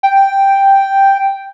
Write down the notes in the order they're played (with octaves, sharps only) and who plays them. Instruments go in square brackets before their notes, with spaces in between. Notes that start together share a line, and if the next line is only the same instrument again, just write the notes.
[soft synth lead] G5